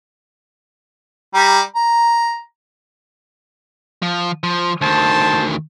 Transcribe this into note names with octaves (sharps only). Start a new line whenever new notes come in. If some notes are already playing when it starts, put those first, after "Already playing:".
G3 A#5
A#5
F3
F3
D2 D#3 C5 A5